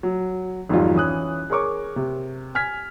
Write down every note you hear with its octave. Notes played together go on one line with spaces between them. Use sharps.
F#3
G#1 F2 F#3 G3 F4
E3 C#4 D#6 F#6
G#4 A#4 C#5 C#6 D6
C3
G#5 F6 G#6 B6